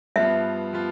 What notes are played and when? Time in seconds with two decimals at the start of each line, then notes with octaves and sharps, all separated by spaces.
0.16 G2 F3 B3 F4 E5
0.73 F3 B3 F4